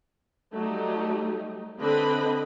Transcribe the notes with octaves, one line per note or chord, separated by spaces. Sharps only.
F#3 G3 A3 D#4 G4
D3 C4 B4 D#5 B5